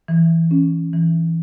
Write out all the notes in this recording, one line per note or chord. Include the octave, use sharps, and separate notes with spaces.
E3
C#4
E3